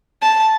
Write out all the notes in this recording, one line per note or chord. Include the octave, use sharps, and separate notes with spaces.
A5